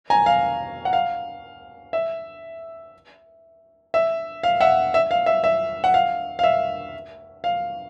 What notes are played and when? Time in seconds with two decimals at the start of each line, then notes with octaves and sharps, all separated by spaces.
0.10 G#5 A#5
0.26 F5
0.85 F#5
0.93 F5
1.93 E5
3.94 E5
4.43 F5
4.61 E5 F#5
4.94 E5
5.11 F5
5.26 E5
5.44 E5
5.84 F#5
5.94 F5
6.39 F5
6.44 E5
7.44 F5